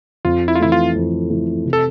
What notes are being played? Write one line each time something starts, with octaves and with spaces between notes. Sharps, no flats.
F2 F4
E4
F4
E3 A3 E4
F4
F2
E3 A3
C3
A4